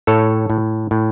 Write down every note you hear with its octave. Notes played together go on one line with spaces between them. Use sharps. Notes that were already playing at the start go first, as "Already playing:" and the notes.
A2 A4 C#5
A2
A2